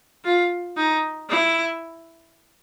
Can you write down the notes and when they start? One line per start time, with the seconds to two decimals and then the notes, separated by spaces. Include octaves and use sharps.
0.25 F4
0.77 D#4
1.29 E4